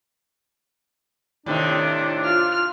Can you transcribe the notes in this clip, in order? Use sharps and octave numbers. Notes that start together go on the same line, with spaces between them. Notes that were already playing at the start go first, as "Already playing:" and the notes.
A2 C3 D#3 D4
F4 F6